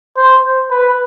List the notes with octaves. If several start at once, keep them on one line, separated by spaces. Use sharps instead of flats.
C5
B4